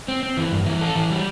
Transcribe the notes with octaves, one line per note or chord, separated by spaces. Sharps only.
C4
C4
E3
G2
E3
A4
E3
G3